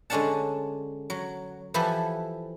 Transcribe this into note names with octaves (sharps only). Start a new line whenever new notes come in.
D3 G#3 C#4 D4 F#5 A5
F#3
E3 F3 E4 G4 A4 B4